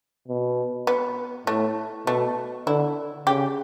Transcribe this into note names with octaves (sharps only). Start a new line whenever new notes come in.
B2
B3
A2 A3
B2 A3
D3 E4
C#3 G4